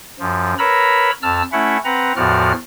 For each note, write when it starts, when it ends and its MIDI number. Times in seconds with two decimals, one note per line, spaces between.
0.20 0.54 42
0.20 0.54 53
0.59 1.11 70
0.59 1.11 71
0.59 1.11 73
0.59 1.11 82
0.59 1.11 83
0.59 1.11 88
1.22 1.42 41
1.22 1.42 81
1.22 1.42 88
1.22 1.42 89
1.52 1.77 57
1.52 1.77 61
1.52 1.77 64
1.52 1.77 76
1.52 1.77 78
1.85 2.13 60
1.85 2.13 71
1.85 2.13 78
1.85 2.13 82
2.16 2.52 40
2.16 2.52 45
2.16 2.52 53
2.16 2.52 66
2.16 2.52 74
2.16 2.52 89